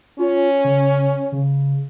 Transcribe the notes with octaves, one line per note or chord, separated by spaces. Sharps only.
C#4 F4
C#3
C#3